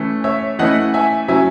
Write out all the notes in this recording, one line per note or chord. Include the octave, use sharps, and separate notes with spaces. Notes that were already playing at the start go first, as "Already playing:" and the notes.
Already playing: E3 A3 C#4 E4
C#5 E5
E3 A3 C#4 E4 D#5 F#5
E5 G#5
F#3 C#4 E4 E5 G#5